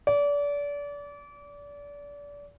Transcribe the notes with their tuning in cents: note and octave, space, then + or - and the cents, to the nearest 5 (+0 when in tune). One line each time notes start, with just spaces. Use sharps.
D5 -30